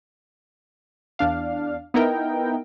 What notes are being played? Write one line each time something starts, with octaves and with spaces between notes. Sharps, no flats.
E2 D4 F5
B3 D#4 E4 A#4 G5